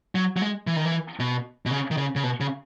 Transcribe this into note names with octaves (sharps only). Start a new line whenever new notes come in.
F#3
F#3
G#3
E3
D#3
E3
B2
B2
C#3
D#3
C#3
C#3
B2
C#3